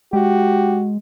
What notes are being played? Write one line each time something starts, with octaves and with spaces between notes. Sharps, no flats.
G#3 F#4 G4